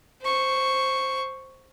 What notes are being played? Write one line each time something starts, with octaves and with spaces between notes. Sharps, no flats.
C5 C#6